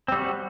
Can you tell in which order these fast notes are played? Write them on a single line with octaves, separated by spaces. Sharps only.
C4 G3 F#4